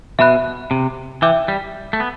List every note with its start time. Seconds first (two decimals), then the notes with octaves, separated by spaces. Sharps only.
0.19 B2 E5 B5 F#6
0.71 C3
1.22 E3 E5 G5 D6 G6
1.48 G3
1.93 A3
2.00 B3